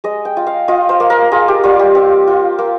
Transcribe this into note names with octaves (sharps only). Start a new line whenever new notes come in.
G#3 D#5
G5
F4
F5
F4 D#5
C5
A#3
A#4
F4 G#4
G4
G3 F4
G4
C4 F4
F4
A#3